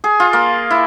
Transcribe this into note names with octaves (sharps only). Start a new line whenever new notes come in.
G#4
F4
A#3
E4